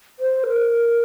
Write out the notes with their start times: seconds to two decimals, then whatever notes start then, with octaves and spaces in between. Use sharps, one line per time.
0.19 C5
0.48 A#4